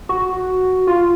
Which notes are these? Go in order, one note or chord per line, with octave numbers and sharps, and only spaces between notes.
F#4
F4